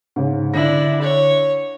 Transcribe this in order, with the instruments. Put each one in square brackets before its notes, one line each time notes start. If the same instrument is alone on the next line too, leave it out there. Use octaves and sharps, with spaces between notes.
[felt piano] G#2 C#3
[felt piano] D3 A#6 [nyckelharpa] D4 E4
[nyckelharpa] C#5